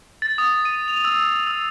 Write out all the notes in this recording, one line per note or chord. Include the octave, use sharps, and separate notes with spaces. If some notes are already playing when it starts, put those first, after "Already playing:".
A6
D#6
D#7
F7
E6
E6